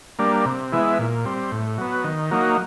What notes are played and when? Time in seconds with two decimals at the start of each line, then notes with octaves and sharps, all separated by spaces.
0.19 G3 A#3 D4
0.46 C3
0.72 E3 G#3 B3 E4
0.99 A#2
1.25 G3 C4
1.52 A2
1.78 F#3 B3
2.04 D#3
2.31 F#3 A#3 D#4